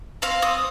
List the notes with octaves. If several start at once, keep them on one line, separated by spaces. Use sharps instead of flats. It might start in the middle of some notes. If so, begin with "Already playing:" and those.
C4 F5
C4 D#6